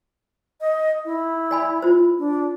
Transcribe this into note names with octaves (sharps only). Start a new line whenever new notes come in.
D#5
E4
D5 G#5 B5
F4 C5
D4